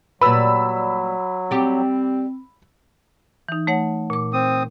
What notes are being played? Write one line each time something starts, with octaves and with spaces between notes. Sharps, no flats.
A#2 F#3 G3 B4 B5 E6
G3 C4 G4
E3 D#4
A3 C#5 F#5
A#2 D6
C4 D#6